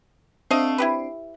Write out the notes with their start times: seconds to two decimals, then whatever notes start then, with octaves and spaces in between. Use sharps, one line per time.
0.51 A3 C4 D4 D#5 F5
0.78 E4 G4 B4